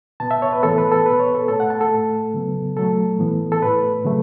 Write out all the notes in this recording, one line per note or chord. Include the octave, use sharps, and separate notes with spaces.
B2 B3 A5
E5
C#5
B4
A2 E3 B3 A4
B4
A4
B2 B3 B4
C#5
A4
A2 A3 A4
F#5
A5
A4
A2 A3
C#3 F#3 B3
B2 F#3 A3 A4
A2 E3 B3
A4
A2 A3 B4
C#3 F#3 A3